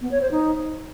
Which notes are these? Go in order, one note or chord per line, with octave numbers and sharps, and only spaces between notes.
B3
C#5
C5
D#4